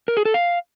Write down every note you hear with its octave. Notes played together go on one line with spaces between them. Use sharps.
A#4
G#4
A4
F5